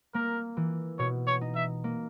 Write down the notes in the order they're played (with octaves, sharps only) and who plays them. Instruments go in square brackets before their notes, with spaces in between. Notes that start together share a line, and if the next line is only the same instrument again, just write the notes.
[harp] A#3 [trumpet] A#4
[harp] E3
[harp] B2 [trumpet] C#5
[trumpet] C#5
[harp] D#4
[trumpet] E5
[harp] A#3